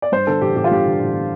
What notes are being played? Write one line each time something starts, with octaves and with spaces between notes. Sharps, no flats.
D5
G2 C5
D3 A4
A1 G4
A1 G4
F4
G2 G4
D3
A1